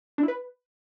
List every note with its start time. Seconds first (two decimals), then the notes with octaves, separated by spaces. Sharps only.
0.18 D4
0.23 E4
0.28 B4